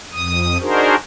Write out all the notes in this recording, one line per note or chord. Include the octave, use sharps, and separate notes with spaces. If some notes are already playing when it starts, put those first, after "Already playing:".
F2 D#6
D4 D#4 F#4 G#4 A#4 C5